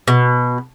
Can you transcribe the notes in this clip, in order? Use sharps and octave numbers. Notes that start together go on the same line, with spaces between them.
B2